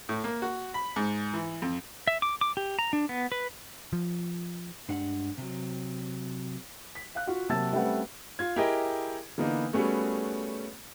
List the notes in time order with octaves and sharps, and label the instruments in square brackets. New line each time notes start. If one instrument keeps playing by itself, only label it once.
[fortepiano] A2
A#3
F#4
B5
G#2
E3
F2
[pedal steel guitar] E5
D6
D6
G4
A#5
D4
B3
B4
[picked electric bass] F3
[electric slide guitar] G2 G#3 D4 G4 F#5
C3 F#3
[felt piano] B6
F5 F#6
F4 F#4 F#5
C3 F#3 A#3 A5 E6 A6
G3 A3 C4 C#4 B4 F#5
[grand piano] F4 G#6
E4 G4 G#4 A#4 D#5 G5
D3 E3 A#3 B3 D4 D#4
G3 A3 B3 C#4 F#4 G#4